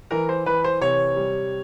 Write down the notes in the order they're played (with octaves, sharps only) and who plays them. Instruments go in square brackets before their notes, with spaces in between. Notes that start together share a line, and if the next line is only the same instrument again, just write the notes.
[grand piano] E3 [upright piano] A#4
[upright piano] C5
[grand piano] E3 [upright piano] B4
[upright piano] C5
[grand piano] C3 [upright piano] C#5
[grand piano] G3